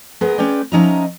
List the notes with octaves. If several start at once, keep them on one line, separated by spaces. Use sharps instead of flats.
G#3 B3 G#4 A#4 B4 D#5
G#3 C#4 B4 D5 G5
F3 C#4 D#4 D#5 E5 A#5